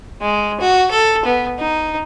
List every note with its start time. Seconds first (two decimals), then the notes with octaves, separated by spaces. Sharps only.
0.21 G#3
0.60 F#4
0.91 A4
1.25 B3
1.59 D#4